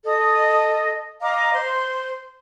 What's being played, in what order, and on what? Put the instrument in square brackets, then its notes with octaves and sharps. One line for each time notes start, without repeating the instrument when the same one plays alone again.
[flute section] A4 D#5 D#6
D#5 F5 A#5 D6
C5 C6